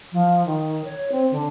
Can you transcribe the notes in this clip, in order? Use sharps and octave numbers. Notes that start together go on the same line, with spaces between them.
F3
D#3
C#5
C4
D3